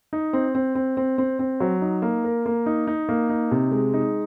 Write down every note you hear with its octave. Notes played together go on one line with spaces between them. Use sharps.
D#4
C4
C4
C4
C4
C4
C4
F#3
D#4
A#3
A#4
A#3
D#4
D#4
A#3
D#4
C3
G#3
D#4